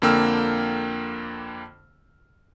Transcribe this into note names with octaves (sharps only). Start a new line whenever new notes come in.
F2 D3 A#3 G5 E6 F6